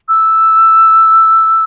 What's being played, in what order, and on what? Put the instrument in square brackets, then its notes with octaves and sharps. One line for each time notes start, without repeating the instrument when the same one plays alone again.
[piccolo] E6